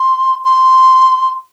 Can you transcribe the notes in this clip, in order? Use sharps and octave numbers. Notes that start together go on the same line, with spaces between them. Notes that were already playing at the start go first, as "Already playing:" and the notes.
Already playing: C6
C6